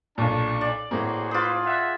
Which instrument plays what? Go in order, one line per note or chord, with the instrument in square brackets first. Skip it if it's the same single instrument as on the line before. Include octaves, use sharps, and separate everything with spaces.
[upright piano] B1 A#2 [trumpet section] D4 A5 C#6
[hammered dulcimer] D5
[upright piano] A2 A#3 [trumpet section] F#4 G#4 C5
[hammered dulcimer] F4 G#4 [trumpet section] B4 C5 D6
[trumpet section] E5 F#5